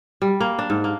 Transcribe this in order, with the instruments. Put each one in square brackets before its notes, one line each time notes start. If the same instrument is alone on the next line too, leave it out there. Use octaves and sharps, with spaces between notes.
[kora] G3
A#3
D4
G#2
A#3